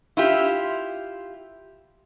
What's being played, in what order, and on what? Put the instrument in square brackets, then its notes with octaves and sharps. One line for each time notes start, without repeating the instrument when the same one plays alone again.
[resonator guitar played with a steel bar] E4 F4 G4